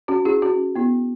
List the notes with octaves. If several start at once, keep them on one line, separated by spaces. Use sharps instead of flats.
C#4 F#4
E4 G#4
C#4 F#4
B3 E4